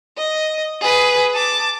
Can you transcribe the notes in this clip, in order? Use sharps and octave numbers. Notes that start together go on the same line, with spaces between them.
D#5
G#4 B4
A5 D6